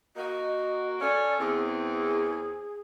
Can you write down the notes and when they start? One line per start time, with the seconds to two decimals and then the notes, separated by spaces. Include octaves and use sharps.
0.16 A#3 F#4 D#5
1.01 C#4 A4 D5
1.39 E2 C4 G#4